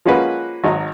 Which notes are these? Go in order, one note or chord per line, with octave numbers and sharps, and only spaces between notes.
F3 G#3 A#3 C#4 F#4 B4
G#1 F#3 D#4